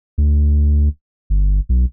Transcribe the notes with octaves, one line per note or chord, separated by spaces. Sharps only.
D2
G1
B1